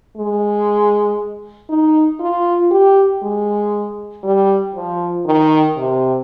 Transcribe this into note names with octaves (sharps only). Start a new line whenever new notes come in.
G#3
D#4
F4
G4
G#3
G3
F3
D#3
C3